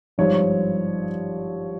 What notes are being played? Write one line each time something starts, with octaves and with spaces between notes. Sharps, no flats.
G#1 G2 F3 C#5